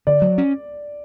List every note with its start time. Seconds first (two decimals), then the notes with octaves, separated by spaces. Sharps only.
0.07 D3 D5
0.22 F#3
0.38 C#4